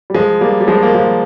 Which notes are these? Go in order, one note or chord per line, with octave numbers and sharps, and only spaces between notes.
G3
F3 G#3
G3 A#3
G3
F3 G#3
A#3
F3 G#3